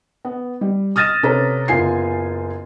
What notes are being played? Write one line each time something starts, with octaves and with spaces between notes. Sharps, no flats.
B3
G3
D#6 F6 A6 A#6 D#7 E7
C3 C#4 A4 B4 A#5
F#1 B3 F4 G#5 C7